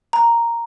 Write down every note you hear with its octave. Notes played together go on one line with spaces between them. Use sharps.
A#5